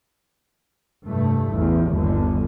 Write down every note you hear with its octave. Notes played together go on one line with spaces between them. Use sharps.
F1 G2 A3
A1 E2
G1 D#2 D3